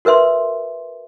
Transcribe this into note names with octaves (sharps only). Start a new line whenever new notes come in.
F#4 A#4 B4 E5 C6